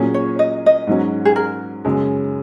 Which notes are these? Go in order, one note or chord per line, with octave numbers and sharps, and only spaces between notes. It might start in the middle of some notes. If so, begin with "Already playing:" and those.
Already playing: A#2 F#3 C#4 G#4
C#5
D#5
D#5
G#2 F#3 C#4
G#4
A#4
F#2 C#3 G#3